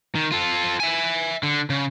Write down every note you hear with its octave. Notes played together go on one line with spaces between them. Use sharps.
D#3
F4 A4
E5 G#5
D3
C#3